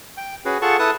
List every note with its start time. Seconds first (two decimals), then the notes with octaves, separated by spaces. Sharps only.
0.17 G5
0.45 C#4 F#4 G#4 B4
0.62 F4 G#4 A4 F#5 A5 C#6
0.79 E4 A4 B4 A5 D#6 F#6